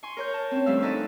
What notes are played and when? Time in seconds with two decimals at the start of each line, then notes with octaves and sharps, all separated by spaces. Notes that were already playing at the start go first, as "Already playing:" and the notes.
0.03 G#5 C6 C#6
0.17 A#4 C#5 G6
0.34 A5
0.51 C4 C#4
0.66 G2 F3 G3 A3 F5 E6
0.82 D#4 A4 B4 D5 D#5